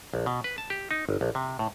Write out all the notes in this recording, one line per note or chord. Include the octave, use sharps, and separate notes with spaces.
A#1
B2
B4
A5
G4
D#4
G1
A#1
C3
A2